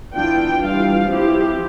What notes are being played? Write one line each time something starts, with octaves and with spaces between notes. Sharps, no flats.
E3 B3 D4 F4 G5
E3 G3 D4 F4 F5
F3 C4 E4 G4